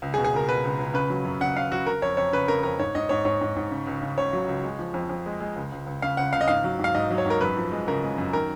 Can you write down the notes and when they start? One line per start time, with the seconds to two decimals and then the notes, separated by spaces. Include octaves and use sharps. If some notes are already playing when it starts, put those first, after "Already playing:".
0.02 C#2
0.14 G#4
0.18 B2
0.24 G#4
0.33 C#2 A#4
0.48 B2 B4
0.64 C#2
0.79 C#2
0.94 C#3 B4
1.10 F#3
1.25 F#2
1.40 C#3 F#5
1.56 C#3 F5
1.72 F#3 F#4
1.86 C#3 A#4
2.02 F2 C#5
2.17 F2 C#5
2.33 C#3 B4
2.48 C#3 A#4
2.63 F2 A#4
2.79 G#2 C#5
2.95 G#2 D#5
3.09 G#2 C#5
3.25 G#2 C#5
3.41 G#2
3.56 G#2
3.71 C#3
3.87 C#2
4.02 C#3
4.18 C#2 C#5
4.33 F#3
4.48 C#2
4.64 G#3
4.79 F3
4.94 F2
5.09 F2
5.26 G#3
5.40 G#3
5.56 C#2
5.72 C#2
5.86 C#2
6.02 C#3 F5
6.17 C#2 F#5
6.33 C#2 F5
6.41 D#5
6.48 G#2 F5
6.64 F#3
6.79 G#2 F5
6.95 G#2 D#5
7.11 F#3
7.18 C#5
7.26 G#2 A#4
7.41 F#2 B4
7.57 F3
7.72 G#3
7.88 C#3 A#4
8.03 G#3
8.18 F#2
8.33 D#3 A#4